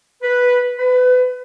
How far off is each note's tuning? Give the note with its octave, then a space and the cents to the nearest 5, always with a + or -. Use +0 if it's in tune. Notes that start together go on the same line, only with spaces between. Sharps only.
B4 -5
B4 +25